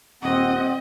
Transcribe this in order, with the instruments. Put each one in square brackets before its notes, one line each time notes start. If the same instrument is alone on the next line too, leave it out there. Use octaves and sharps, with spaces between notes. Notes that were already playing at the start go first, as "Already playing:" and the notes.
[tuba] D#1 [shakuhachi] C4 [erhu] D#5 [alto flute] F#5